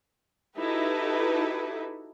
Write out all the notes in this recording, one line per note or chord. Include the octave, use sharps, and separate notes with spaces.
D#4 E4 F#4 G4 A4 B4